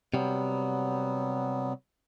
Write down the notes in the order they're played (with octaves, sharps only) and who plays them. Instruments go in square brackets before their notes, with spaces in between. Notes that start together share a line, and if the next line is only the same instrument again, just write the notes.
[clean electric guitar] C3 G3 [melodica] F#3 B3